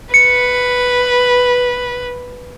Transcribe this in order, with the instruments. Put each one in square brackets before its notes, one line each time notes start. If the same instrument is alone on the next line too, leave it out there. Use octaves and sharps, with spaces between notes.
[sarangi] B4 [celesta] C#7